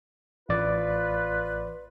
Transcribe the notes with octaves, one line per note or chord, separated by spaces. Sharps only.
A1 F4 B4 D5